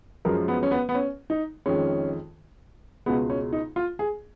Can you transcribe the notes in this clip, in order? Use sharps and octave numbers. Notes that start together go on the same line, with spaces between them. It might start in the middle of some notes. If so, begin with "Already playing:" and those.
F#2 F3 G#3 A#4
B3
C#4
B3
B3
C#4
D#4
F2 D#3 G#3 C#4
C#2 B2 G#3 B3
C#4
D#4
F4
G#4